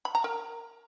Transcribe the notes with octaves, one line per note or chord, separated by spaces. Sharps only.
B5
A#5
A#4